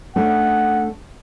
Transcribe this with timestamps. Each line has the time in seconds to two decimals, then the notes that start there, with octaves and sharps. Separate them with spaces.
0.16 A3 C#4 D4 F#5